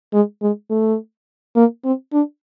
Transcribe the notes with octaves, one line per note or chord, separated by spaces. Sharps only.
G#3
G#3
A3
A#3
C4
D4